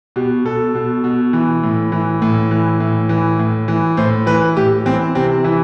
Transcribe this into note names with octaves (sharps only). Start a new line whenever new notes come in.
B2 G4
B2 A4
B2
B2
E3
A2
E3
A2
E3
A2
E3
A2
E3
A2 C5
E3 B4
A2 G4
E3 C4
C3 C4
E3 E4